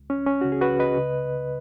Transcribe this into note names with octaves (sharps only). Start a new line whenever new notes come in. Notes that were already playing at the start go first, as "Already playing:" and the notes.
Already playing: C#2
C#4
C#2
C#4
C#3 F#4
G#4
F#4 B4
C#2
B4 D#5
C#3